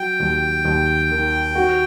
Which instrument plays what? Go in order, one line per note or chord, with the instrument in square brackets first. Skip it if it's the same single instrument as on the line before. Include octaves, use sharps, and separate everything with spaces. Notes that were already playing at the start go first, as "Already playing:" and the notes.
Already playing: [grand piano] F#3 [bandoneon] G5
[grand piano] D#2
D#2
D#3
F#4